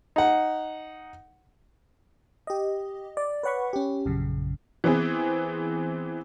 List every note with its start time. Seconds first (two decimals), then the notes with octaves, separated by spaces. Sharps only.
0.16 D#4 F#5
2.47 G4 D#5
3.17 D5
3.43 B4 C#5 F#5 B5 C#6
3.73 C#4 G4
4.05 A#1 F#2 C#3
4.84 E3 B3 C4 G#4